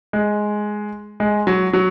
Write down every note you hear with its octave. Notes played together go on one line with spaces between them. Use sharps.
G#3
G#3
F#3
F#3